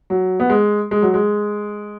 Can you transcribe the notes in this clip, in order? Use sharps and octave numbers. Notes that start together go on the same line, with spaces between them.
F#3
B3
G#3
G#3
F#3
G#3